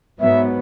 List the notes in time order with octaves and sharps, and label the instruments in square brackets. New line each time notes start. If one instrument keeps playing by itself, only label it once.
[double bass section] G#2 F#3 B3 [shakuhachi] E5